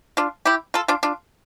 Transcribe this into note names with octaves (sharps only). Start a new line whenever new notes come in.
D4 F4
E4 G4
F4 A4
D4 F4
D4 F4